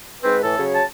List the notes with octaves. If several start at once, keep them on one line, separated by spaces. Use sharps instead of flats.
G#2 C4 B4
A2 E3 A4
C#3 F#3 C#5
A5